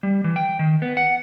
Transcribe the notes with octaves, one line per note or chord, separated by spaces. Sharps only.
G3
E3
G5
D#3
B3
F#5